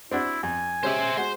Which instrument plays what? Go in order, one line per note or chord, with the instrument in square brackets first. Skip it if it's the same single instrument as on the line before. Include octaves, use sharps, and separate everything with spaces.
[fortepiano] C4 D4 F#4 [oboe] E4
[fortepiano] F2 [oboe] G#5
[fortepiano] G#3 C#4 G4 [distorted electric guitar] C5 E5
[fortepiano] G#3 F#4 [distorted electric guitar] C5